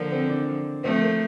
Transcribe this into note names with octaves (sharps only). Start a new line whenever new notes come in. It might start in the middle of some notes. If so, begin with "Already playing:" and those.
Already playing: D3 F3 A#3
C4
D4
F3 A3 C4
A#3